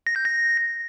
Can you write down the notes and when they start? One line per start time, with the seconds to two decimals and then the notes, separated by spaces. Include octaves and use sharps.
0.07 A#6
0.16 G6
0.25 A#6